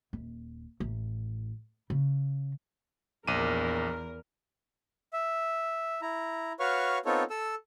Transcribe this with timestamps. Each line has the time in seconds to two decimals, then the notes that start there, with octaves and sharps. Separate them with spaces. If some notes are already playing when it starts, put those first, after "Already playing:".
0.13 D#1
0.80 A1
1.90 C#3
3.27 A#1 E2 A#4 D6 D#7
5.13 E5
6.02 E4 A#5
6.60 F#4 B4 C#5 F5 C#6 F6
7.05 B3 C4 D#4 F4 A4 C#5
7.30 A4 E6